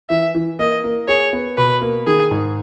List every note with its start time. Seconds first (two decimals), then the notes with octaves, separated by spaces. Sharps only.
0.10 E3 E5
0.35 E3
0.59 A#3 D#5
0.84 A#3
1.08 G#4 C#5
1.33 B3
1.57 B2 B4
1.82 A#3
2.07 D#3 G#4
2.31 G#2